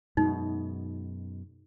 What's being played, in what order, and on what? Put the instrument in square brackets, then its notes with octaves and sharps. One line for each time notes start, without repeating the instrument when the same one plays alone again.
[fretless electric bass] F#2 B2 G#3 [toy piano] D#4